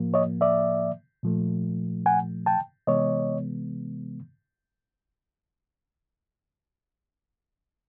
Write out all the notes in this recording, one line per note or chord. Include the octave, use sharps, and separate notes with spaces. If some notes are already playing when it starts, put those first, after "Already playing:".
Already playing: A2 F3 A#3
C#5 D#5
D5 E5
A#2 F3 A3
F#5 G#5
G5 A5
C3 E3 G#3 B3 C#5 D#5